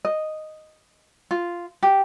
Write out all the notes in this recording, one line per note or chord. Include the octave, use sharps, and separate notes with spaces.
D#5
F4
G4